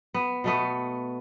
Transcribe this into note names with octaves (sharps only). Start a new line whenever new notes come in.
B3
B2 A3 B3